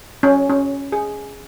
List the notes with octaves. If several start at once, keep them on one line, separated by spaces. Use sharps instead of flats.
C#4
C#4
G#4